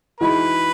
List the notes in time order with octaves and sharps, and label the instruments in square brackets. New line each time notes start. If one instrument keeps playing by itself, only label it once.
[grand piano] E3 G#3 D#4 F#4 [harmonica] B4